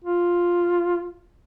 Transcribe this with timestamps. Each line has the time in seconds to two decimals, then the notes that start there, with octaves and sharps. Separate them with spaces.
0.04 F4